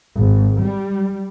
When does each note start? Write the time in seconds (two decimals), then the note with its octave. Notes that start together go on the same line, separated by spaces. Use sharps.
0.17 G#1
0.64 G3